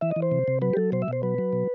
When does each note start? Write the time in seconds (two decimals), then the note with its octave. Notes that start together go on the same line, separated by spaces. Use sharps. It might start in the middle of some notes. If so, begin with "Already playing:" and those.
0.01 E3 E5
0.11 D#5
0.16 E3
0.22 C5
0.31 C3
0.48 C3
0.62 F#3 B4
0.73 G4
0.77 F#3 A4
0.92 B2 C5
1.02 E5
1.08 B2 C5
1.23 F#3 B4
1.38 F#3
1.53 B2